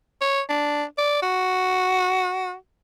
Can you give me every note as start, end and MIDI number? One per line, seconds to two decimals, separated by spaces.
0.21 0.41 73
0.49 0.83 62
0.98 1.19 74
1.22 2.54 66